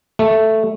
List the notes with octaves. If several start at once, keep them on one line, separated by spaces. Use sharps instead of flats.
A3